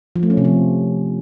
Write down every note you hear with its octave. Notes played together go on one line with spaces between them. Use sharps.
F3
A3
C#4
C3
F3